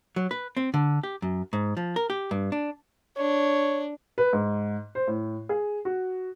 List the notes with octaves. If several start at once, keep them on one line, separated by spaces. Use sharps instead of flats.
F#3
B4
C4
D3
G4
F#2
G#2
F3
A#4
G4
G2
D4
D4 C#5
B4
G#2
C5
A2
G#4
F#4